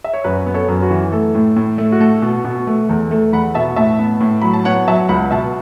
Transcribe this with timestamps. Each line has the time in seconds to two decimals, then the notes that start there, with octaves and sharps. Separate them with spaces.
0.04 E5
0.13 C#5
0.24 F#2 F#4 B4
0.46 B3
0.54 A4 C#5
0.68 F#2
0.83 F#4 B4
0.90 E3
1.12 A3 A4
1.35 A2
1.56 A2
1.78 A3
1.92 F#4
2.00 A3 A4
2.22 B2
2.45 B2
2.67 A3
2.89 E2 A4
3.11 A3 A4
3.33 E2 F#5 B5
3.54 B2 E5 A5
3.76 A2 E5 A5
3.99 B3
4.21 A2
4.42 F#3 B5
4.53 A5
4.65 B3 C#5 F#5
4.88 F#3 E5 A5
5.09 C#2 F#5 B5
5.31 B2 E5 A5